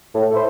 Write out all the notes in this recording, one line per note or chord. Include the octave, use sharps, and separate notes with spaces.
A2
A3 E4 C5